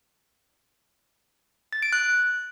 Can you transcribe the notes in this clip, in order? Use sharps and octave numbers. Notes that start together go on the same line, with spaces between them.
A6
D7
F#6